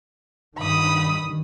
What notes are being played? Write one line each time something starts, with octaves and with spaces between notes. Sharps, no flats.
G2 D#3 B5 D#6